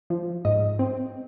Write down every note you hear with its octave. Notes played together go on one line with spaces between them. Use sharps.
F3
G#2 D#5
C4